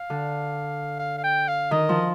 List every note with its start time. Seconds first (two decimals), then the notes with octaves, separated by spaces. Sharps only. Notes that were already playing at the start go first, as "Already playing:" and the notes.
Already playing: F5
0.10 D3
0.99 F5
1.18 F5
1.24 G5
1.48 F5
1.71 D#3 D#5
1.89 F3